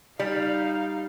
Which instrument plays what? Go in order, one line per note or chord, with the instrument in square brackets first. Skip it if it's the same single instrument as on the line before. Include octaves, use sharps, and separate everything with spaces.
[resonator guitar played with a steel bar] G3 [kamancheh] D#4 F5